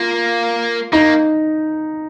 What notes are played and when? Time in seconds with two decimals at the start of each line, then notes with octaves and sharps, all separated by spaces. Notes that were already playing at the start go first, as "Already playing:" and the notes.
Already playing: A#3 F4
0.93 A#3 D#4